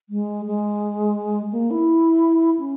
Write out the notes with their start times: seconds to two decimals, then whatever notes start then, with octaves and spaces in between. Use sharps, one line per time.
0.09 G#3
0.46 G#3
1.52 A#3
1.71 E4
2.59 C#4